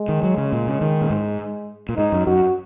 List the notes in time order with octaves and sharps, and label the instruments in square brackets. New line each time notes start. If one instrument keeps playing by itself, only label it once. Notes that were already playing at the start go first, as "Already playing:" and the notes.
Already playing: [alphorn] G#3
[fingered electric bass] D#3
F#3
C#3
A#2
C#3
D#3
A#2
G#2
A#2
[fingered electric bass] G#2 [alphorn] D#4
[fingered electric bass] F#2
[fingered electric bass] F#2 [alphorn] F#4